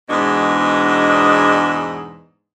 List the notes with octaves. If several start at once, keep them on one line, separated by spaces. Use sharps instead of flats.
E2 G#2 B2 G#3 D4